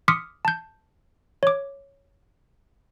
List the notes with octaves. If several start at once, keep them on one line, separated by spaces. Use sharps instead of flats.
C6 D6 D#6 F6 B6 C#7
A5 G6
C#5 D6